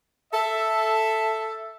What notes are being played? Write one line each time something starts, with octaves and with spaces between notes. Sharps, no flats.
A4 E5